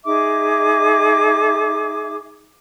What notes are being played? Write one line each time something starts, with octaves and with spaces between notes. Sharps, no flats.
D#4 G#4 E5 D6